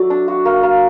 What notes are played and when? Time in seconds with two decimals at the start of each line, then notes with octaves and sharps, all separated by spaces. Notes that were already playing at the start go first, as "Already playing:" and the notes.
Already playing: F#3 A3 D5
0.10 D4
0.28 F#4
0.45 A#3
0.63 A#3